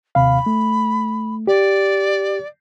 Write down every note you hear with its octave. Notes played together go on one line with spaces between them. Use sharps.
D#2 C3 F5 B5
A3
G4 D5